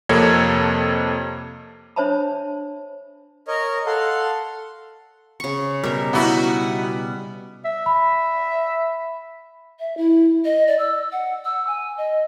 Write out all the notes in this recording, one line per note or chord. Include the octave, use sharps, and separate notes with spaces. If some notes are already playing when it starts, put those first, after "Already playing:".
F2 C3 A#3 A4 C#5 G#6
D4 C5 C#5 E5 A5 B5
A#4 C#5 D#5
A4 F5 F#5 C6
C#3 C#6
B2 G3 A#4 E5
B3 D#4 E4 F#4
E5
B5
E5
E4
D#5
D5
E6
F#5
E6
G#5
D#5